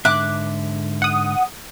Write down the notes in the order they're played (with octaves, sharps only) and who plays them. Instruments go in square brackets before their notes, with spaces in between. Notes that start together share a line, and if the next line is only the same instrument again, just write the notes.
[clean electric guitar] G#2 D3 E5 [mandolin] D6 F#6
[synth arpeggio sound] F#5 D#6